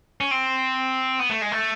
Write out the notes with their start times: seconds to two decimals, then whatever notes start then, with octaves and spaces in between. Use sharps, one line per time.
0.21 C#4
0.31 C4
1.19 B3
1.30 A3
1.41 G#3
1.52 A3